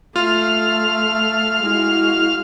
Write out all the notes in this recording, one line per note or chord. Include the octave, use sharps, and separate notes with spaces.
A3 F4 F5 F6
G#3 E4 F#4